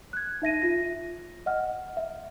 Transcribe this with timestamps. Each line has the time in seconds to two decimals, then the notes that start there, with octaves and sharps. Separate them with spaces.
0.13 F#6 G#6
0.42 D#4 E5 A#6 D#7
0.62 F4 A#6
1.46 D#5 F#5 F6
1.97 E5